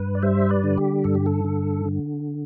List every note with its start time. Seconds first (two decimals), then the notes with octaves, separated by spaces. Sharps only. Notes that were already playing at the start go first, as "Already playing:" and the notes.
Already playing: G2 B4
0.15 D5
0.22 G3 C5 E5
0.50 B4 D5
0.63 D3
0.78 G4
1.04 G2 A4
1.15 G4
1.26 A4
1.44 D3
1.85 D3